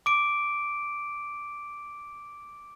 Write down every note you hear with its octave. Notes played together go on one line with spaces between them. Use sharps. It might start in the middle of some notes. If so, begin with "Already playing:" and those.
D6 D7